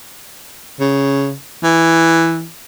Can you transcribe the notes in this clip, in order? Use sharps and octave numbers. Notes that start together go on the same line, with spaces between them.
C#3
E3